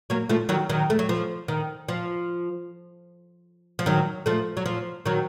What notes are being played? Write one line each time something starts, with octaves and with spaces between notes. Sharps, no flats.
F#3 A#3
F3 A3
D#3 F#3
D#3 F#3
A3
F#3
F3
D#3
F3
F3
D#3 F#3
F3 A3
F#3
F3
D#3 F#3